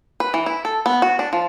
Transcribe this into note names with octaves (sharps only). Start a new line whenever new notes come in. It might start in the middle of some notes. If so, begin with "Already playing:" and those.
B4
E3
E4
A4
B3
F#4
D4
F3